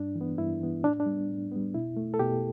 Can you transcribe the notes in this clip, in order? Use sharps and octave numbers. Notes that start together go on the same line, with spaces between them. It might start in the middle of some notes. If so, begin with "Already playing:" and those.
Already playing: G2 D4
E3
B3
G2 E4
E3 B3
A2 D4
D4
G3 B3
A2
G3 B3
B2 E4
A3
A4
B2 G4